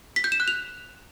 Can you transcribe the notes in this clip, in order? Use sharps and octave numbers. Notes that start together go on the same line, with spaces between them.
B6
G6
E7
F#6
F7